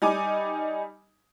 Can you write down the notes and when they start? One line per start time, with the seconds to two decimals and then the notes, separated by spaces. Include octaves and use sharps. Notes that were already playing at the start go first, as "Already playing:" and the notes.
0.02 G3 D#4 G#5 D6